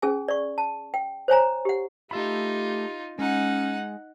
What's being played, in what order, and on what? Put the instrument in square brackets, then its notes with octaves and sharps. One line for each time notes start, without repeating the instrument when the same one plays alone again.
[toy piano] C#4 G#4 G#5
D5 C#6
A5
G5
C5 C#5 G#5 A#5
G4 F#5
[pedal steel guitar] A3 E5 B5 [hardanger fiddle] D#4 F4 [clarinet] G4
[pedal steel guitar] G#3 [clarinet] C#4 [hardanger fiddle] D#4 F#5